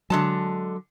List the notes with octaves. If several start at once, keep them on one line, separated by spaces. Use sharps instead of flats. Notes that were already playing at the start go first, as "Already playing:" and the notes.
D3 F#3 G#3 A5